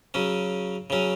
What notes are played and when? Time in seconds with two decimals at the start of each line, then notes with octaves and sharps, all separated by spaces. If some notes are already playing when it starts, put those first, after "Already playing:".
0.14 C#3 F#3 C#4
0.90 C#3 F#3 C#4